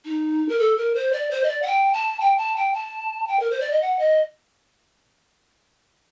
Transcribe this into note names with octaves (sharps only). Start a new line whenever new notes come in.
D#4
A#4
A4
A#4
C5
D5
C5
D#5
D5
F#5
G5
A5
G5
A5
G5
A5
G5
A#4
C5
D5
D#5
F#5
D#5